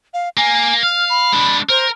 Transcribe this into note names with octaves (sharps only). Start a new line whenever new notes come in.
F5
A#3 G#5
F5 F6
B5
G#3 D4
A#4 C5